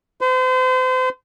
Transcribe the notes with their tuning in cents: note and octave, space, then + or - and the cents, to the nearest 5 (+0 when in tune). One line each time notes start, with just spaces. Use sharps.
C5 -35